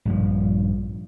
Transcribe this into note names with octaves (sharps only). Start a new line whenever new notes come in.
A#1 G2 F3